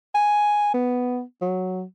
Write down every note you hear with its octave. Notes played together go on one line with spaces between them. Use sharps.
G#5
B3
F#3